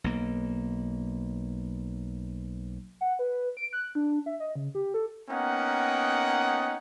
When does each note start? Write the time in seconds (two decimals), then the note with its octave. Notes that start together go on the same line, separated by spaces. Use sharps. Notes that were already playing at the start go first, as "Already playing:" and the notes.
0.04 B1 A#3
3.01 F#5
3.19 B4
3.57 D7
3.73 F#6
3.95 D4
4.26 E5
4.40 D#5
4.56 C#3
4.75 G4
4.94 A4
5.29 A#3 B3 C#4 D#4 F#5 G5